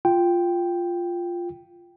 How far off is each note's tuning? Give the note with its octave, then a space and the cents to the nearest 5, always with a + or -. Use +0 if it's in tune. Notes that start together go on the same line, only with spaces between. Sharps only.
F4 +0 G5 +0